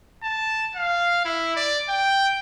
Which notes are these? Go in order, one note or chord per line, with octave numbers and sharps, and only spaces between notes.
A5
F5
E4
D5
G5